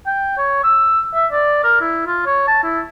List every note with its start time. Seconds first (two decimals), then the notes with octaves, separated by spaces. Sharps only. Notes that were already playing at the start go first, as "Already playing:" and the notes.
0.07 G5
0.37 C#5
0.64 E6
1.14 E5
1.32 D5
1.64 A#4
1.81 E4
2.06 F4
2.26 C#5
2.48 A5
2.63 E4